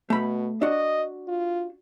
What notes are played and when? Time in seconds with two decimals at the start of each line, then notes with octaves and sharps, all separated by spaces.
0.10 B2 A3 B5
0.62 D4 F#4 D#5
1.28 F4